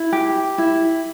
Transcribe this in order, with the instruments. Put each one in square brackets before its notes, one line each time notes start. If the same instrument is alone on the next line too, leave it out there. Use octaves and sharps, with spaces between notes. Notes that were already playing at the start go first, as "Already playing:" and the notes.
Already playing: [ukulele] E4
G4
E4